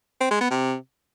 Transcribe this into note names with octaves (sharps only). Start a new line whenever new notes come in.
C4
G#3
B3
C3